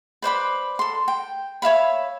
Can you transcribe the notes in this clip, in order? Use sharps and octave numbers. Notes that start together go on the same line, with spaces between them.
B4 C5 D5 B5
A4 C6
G5
C#5 E5 F5 B5